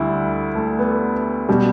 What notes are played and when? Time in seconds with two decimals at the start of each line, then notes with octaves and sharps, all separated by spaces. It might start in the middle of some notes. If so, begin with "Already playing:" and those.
Already playing: D2 D3 G3 E4
0.55 A3
0.79 B3
1.49 B2 G3